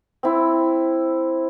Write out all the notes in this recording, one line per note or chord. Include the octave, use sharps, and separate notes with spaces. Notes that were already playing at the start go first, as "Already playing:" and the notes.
C4 E4